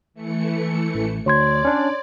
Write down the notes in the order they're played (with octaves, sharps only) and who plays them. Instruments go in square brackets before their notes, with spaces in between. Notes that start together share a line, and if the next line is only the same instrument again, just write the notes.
[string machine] E3 A3 C#7
[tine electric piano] A1
[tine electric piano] D2 [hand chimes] C#5 C6 G#6 [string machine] D5
[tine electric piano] C#4 D4